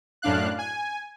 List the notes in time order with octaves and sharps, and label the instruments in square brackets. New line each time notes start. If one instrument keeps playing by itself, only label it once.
[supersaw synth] F#2 A2 D4 F5 F#6
G#5